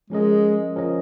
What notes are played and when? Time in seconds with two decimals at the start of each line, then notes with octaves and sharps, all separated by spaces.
0.10 F3 G#3 C#4 A#4 D#5
0.76 F3 C#4 A#4 D#5